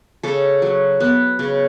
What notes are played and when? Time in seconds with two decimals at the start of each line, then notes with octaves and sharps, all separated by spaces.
0.23 C#3 A4
0.62 F#3
1.00 B3
1.39 C#3